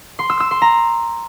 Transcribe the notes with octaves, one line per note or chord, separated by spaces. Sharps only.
C6
E6
E6
C6
A#5